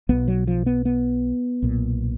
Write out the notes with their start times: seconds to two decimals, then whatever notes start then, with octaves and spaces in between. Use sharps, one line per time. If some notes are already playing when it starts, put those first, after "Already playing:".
0.09 B1 B2 B3
0.28 F#3
0.47 F3
0.66 B3
0.85 B3
1.62 B1 A#2